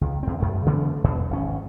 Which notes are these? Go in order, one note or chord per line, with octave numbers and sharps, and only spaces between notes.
C#2
E2 C4
F#2 A3
C#3 E3 A3 B3
E2 B2
G#1 C#4